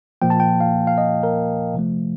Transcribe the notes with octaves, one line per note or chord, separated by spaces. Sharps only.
A#2 F3 A#3 G5
A5
G5
F5
F5
D#5
A#4
C3 F3 A3